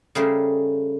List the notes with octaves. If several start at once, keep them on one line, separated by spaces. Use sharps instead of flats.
C#3 G3 A3 G#4 A#4 C5